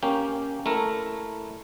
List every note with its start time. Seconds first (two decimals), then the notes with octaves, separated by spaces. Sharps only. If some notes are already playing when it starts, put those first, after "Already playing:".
0.03 A#3 C#4 G4
0.66 A3 E4 A#4